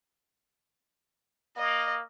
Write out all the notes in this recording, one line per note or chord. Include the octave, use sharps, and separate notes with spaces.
A#3 D#5